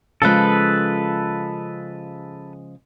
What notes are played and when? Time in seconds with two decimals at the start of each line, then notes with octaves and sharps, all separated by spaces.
0.22 C#3 F3 G#3 A4 B4